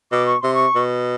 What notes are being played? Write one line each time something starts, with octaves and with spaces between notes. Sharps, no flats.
B2 D6
C#6
C3 C6
C#6
B2